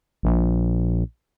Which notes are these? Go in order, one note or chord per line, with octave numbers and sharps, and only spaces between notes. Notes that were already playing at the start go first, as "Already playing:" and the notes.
A#1